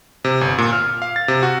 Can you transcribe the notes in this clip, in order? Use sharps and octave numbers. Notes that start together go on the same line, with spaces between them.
C3
G1
A#2
F6
F5
A6
C3
F#4